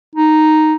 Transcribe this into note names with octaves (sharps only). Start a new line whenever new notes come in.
D#4